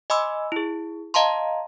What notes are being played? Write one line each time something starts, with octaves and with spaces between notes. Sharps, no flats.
D#5 G#5 B5 C6 D6 E6
E4 G#4
D#5 F5 A5 A#5 C6